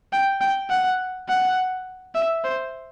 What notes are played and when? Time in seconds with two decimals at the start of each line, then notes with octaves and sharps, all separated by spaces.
0.13 G5
0.41 G5
0.70 F#5
1.29 F#5
2.15 E5
2.44 C5